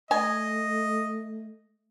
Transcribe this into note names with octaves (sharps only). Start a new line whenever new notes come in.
A3 D#5 G#5